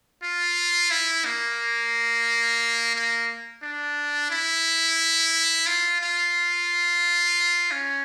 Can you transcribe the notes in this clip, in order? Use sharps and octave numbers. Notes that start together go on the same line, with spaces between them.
F4
E4
A#3
A#3
D4
E4
F4
F4
C#4